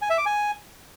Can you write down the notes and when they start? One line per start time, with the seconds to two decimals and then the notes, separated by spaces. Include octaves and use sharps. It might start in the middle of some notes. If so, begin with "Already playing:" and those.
0.02 G#5
0.10 E5
0.18 D6
0.26 G#5